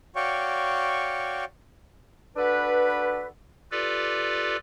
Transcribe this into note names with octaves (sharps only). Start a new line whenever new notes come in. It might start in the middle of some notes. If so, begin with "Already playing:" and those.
F#4 C#5 D5 F5 G5 C#6
D4 F#4 A4 B4
F4 G4 A4 B4 D5